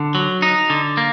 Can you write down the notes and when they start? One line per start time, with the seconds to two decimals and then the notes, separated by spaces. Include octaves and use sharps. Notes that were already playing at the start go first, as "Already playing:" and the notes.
Already playing: D3
0.15 F#3
0.42 D#4
0.70 D3
0.97 A#3